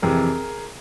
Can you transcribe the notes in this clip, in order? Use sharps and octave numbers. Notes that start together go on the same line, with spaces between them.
F2 C3 E3 G#4 A#4